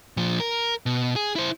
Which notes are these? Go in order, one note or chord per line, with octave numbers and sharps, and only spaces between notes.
A#2 F3
A#4
B2
G#4
E4 C5